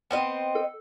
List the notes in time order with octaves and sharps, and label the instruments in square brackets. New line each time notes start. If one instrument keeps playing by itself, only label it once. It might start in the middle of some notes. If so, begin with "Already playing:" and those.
[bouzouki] B3 C4 D#5
[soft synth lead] A4